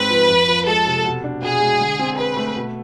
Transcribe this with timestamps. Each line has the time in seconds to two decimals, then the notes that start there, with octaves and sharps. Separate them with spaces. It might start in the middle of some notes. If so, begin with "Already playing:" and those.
Already playing: G#2 G#3 C4 B4
0.10 F3
0.29 F2
0.48 F3
0.67 G#3 A4
0.87 C3
1.05 B2
1.24 D4
1.42 B2 G#4
1.61 G#3
1.81 D3
1.99 C4
2.18 G#4 B4
2.37 A3
2.56 B2